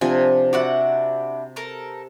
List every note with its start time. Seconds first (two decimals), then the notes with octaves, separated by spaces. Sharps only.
0.01 C3 F3 D4 G#5
0.53 D4 E4 F#4 F#5
1.56 A4 A#4